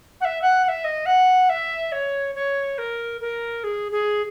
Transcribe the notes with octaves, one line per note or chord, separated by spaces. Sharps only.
F#5
E5
F#5
F#5
E5
D#5
F#5
E5
C#5
C#5
A#4
A#4
G#4
G#4